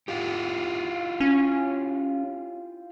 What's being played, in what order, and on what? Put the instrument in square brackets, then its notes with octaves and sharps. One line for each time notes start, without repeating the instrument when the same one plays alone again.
[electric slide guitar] E4 F4 G4
[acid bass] C#4